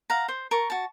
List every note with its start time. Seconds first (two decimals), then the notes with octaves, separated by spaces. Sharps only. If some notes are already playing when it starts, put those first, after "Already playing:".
0.10 F5 F#5 A#5
0.28 C5
0.51 A#4 A5 C#6
0.70 F#4 A5